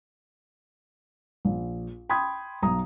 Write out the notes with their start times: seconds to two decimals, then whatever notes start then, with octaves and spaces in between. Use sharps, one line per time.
1.45 A#1
2.09 G5 B5 C6 D#6 G#6
2.63 B1 A#5 D#6